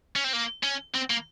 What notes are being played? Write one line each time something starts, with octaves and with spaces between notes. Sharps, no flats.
C#4
C4
A#3
C#4
C4
A#3